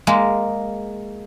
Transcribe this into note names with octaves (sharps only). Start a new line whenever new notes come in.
G#3 A#3